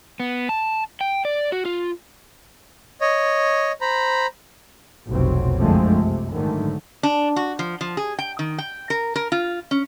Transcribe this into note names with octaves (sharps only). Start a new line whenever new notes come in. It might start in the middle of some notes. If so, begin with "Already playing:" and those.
B3
A5
G5
D5
F#4
F4
C#5 D#5
C5 A#5 B5
F1 B1 C3 F#3 C4
F#2 D3 F3 G#3 A3 C4
C3
G#2 D3 D#3 F#3 A3
D4
F#4
F3
F3
G#4
G5
D#3
G5
A#4
A#4
F4
C#4